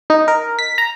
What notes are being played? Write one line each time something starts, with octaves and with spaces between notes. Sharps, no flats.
D#4
A#4
B6
A#5